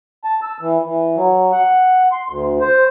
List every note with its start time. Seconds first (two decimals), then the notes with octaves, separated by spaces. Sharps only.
0.24 A5
0.43 E6
0.61 E3
0.84 E3
1.16 F#3
1.52 F#5
2.12 C6
2.29 D2
2.61 C5